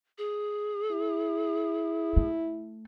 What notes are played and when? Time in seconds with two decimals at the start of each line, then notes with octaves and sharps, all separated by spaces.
0.18 G#4
0.92 E4
2.17 A3